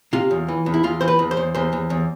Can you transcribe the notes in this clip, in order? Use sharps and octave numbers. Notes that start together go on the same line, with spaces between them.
C3 F4
E2
E3
E2
E4
E2 F4
E3 C5
B4
E2
C5
E2
E2 C5
E2
E2